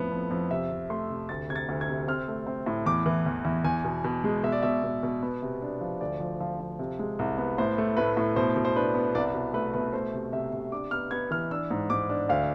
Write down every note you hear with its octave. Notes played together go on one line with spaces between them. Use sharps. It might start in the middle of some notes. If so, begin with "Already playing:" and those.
Already playing: F2 A2 B3
F2
F2
C3 E5
C3
A3 C6
C3
D2 A6
C3 G#6
A6
D2
G#6
C3
C4 F6
A3
C4
A2
E2 D6
E3
E2
E2
E2 G#5
B2
B2
G#3
B2 E5
D5
B2 E5
B2
B2
B3
C3
D4
F3
D2 D5
F3
F3
F3
C3
G#3
C2
B3
A2 C5
A3
A2 B4
A2
B2 C5
B2
C5
D4 B4
B3
C2 D5
B2
A3 B4
B2 B4
A3 C5
C3
C3 E5
C3
D4 D6
B3 F6
B3 G#6
E3 F6
D4 E6
G#2
G#2 D6
D4
D2 F5